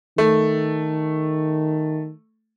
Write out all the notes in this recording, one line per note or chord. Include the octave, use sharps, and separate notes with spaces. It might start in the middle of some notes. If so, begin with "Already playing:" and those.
D#3 A3